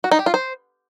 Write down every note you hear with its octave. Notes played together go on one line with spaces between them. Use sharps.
F#4
D#4
G4
F4
C5